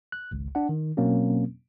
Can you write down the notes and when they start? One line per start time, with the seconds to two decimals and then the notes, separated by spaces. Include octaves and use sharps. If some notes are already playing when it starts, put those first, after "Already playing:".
0.12 F#6
0.31 G#1 C#2
0.55 D4 F#5
0.69 D#3
0.97 B2 F#3 A#3 C4 C#4